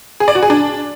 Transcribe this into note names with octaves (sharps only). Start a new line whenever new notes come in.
G#4
D5
F#4
G#4
D4